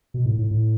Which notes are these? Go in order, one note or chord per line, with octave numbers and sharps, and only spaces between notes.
B2
A2
A2
A2